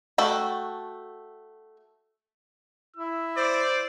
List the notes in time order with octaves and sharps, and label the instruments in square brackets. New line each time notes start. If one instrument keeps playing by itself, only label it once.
[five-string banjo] A3 F#4 A4 G5
[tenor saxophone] E4 [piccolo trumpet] E6
[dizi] C5 [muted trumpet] D5